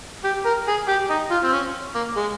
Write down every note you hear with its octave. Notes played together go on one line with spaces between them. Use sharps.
G4
A#4
G#4
G4
D#4
F4
C4
C#4
A#3
G#3